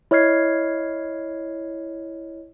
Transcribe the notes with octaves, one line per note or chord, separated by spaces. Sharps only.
E4 C#5 D#5 F6 G#6 C7